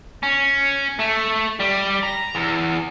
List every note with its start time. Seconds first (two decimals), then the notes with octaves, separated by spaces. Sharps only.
0.23 C#4
0.99 A3
1.60 G3
2.04 A#5
2.35 E2